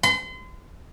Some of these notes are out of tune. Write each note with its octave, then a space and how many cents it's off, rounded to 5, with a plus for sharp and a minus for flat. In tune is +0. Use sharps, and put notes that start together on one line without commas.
C6 -40